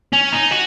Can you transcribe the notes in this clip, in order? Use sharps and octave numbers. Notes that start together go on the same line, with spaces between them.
C#4
D#4
F#4